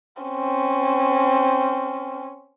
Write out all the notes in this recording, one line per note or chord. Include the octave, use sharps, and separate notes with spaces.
C4 C#4